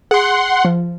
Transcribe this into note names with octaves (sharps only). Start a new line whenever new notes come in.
G#4 F#5 C6
F3